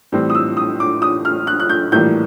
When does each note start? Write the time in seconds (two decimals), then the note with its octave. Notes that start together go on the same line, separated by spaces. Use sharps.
0.12 A2 E3 G3 C4
0.30 D#6
0.35 E6
0.57 D#6
0.80 D6
1.02 D#6
1.25 F6
1.47 F#6
1.60 F#6
1.69 G6
1.91 A#1 A2 E3 G3 A#3 G6